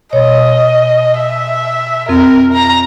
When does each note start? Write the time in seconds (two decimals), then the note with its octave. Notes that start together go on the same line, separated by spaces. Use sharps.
0.13 B2 C#5 D#5
1.17 E5
2.09 F2 C4 A#4
2.53 A#5